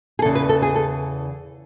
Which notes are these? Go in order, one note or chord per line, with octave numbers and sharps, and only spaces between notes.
G#4
E2 C#3 E3 A4
B4
A4
G#4
A4